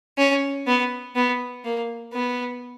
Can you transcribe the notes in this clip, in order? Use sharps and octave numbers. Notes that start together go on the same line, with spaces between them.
C#4
B3
B3
A#3
B3